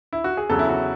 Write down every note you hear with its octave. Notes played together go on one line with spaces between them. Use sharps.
E4
F#4
G#4
E2 C#3 F#3 A4
E4
F#4